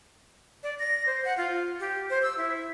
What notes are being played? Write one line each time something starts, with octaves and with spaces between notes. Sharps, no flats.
D5
A#6
C5
F#5
F4
G4
C5
E6
E4